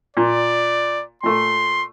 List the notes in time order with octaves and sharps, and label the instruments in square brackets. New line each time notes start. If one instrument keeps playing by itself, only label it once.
[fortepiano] A#2 [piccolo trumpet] D5
[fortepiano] A#2 A3 [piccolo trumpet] C6